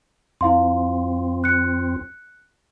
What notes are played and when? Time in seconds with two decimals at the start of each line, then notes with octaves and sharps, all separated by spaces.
0.41 F2 C4 E4 F5 C6
1.44 F#6 C#7